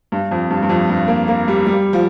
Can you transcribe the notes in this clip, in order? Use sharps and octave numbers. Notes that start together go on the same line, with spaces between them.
G2
F2
G2
G2
F2
G2
A#3
A#3
G3
G3
F3